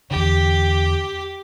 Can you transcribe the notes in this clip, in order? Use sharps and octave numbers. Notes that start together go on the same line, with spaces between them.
E2 D3 G4